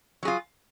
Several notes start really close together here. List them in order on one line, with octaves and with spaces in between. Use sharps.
F#3 G#4 F4